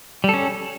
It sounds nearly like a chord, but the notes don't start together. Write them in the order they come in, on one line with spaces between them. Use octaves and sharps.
G3 A4 C#4